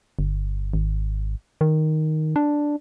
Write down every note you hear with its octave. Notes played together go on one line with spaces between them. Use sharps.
G1
G#1
D#3
D4